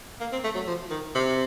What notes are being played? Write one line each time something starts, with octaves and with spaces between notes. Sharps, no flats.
A#3
C4
A3
F#3
F3
D#3
C3